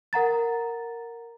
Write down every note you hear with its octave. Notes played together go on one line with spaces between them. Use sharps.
A#4 F#5 A#5 A6